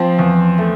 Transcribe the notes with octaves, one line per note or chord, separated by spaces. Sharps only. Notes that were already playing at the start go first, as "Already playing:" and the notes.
Already playing: F3 C4
E2
A3